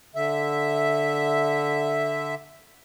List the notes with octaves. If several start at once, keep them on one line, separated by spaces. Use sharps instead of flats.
D3 E5